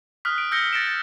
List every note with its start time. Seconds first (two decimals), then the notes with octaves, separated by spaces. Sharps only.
0.25 D#6 F6 F#6 B6
0.38 D7
0.52 E6 G6 A#6 C#7 G7
0.73 A6 A#6 C#7 D7 E7
0.87 A6